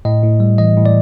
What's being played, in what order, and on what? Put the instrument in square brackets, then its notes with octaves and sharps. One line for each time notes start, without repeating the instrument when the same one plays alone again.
[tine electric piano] A2 D#5
A2
G3
E3 D#5
A2
D5